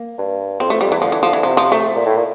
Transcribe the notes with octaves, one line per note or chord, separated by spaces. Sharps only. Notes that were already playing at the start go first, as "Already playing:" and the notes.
Already playing: A#3
G2
F2 C4
F2 A3
F2 G3
E2 E3
D3 F3
E3
F3
E3
C3 F3
F3
A3
A#2
A2
A#2